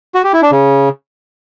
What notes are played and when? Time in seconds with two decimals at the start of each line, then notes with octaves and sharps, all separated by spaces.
0.15 F#4
0.24 G4
0.33 E4
0.42 D4
0.52 C#3